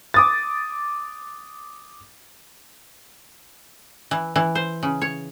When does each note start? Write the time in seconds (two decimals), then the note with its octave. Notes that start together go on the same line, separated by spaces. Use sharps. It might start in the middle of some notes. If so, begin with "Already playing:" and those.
0.14 D6 D#6 A6
4.11 E3
4.36 E3
4.55 C5
4.83 C#3
5.02 C#5